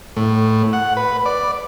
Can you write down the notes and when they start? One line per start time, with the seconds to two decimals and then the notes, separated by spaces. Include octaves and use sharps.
0.17 A2
0.73 F#5
0.97 B4
1.26 D5